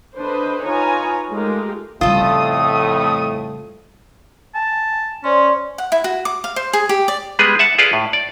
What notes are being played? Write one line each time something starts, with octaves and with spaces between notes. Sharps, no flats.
D3 D4 B4 C5 D#5
D#4 F4 B4 C#5 G#5 A#5
G#3 A3 D#4 F4 G4 A#4
F2 A2 C#3 G3 A3 F4 A4 D#6
G#5 A5
C#4 C5 D5 C6
F#5
E4
F#4
D6
F5
C5
G#4
G4
D5
G3 G#3 B3 G#4 B4
E5 F#5 A5
F4 G#4 A4 B4 D5 F5
A2
D5